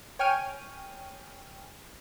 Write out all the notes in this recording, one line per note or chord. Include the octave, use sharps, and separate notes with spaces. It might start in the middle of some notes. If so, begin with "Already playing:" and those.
C#5 G5 G#5 F6 D#7